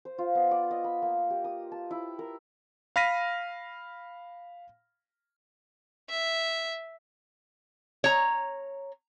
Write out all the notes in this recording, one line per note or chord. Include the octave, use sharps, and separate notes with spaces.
C5
F4
B3
D5
D#5
B5
A#3
G4
D#6
A5
E4
A#4
F5 B5 F6 A#6 B6 D#7
E5
C#5 A#5